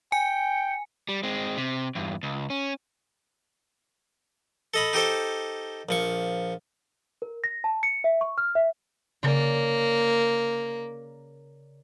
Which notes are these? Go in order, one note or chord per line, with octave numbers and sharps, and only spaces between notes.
G5 G#5 C#7
G3
G#3 C4
C3
E2 G2
C#2
C#4
A4 D#5 B5
D#4 G4 A4 C5
A#1 F3 C#6
A#4
A#6
A5
C#7
E5
C#6
F6
E5
C#3 A#3 D5